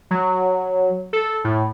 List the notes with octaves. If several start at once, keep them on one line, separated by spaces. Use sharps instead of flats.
F#3
A4
A2